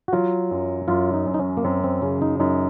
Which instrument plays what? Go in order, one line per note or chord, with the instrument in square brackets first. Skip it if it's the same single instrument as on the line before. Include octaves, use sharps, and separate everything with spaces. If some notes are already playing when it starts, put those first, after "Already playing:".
[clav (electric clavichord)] F#4
[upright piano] F#3 [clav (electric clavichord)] F4
[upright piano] F#2
[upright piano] F#2 [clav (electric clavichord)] F4
[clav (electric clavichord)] D#4
[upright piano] F#2
[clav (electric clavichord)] D#4
C#4
A#3
[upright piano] F#2 [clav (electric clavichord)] C4
[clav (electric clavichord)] C4
[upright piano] C#3 [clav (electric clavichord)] C#4
[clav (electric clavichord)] D#4
[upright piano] F#2 [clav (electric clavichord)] D#4